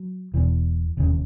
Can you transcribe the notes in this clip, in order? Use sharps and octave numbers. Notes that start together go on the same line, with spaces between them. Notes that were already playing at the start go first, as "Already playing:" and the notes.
Already playing: F#3
E1 E2 B2 E3
E1 D#2 C#3